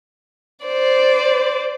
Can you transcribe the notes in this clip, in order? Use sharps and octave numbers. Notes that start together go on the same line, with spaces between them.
C5 D5